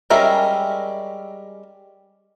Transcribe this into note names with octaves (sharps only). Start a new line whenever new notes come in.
G3 G#3 C#4 A#4 E5